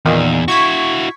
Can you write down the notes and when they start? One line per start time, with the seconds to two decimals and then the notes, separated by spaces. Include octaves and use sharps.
0.05 E2 A#2 D#3
0.48 E4 F#4 C#6 G#6 B6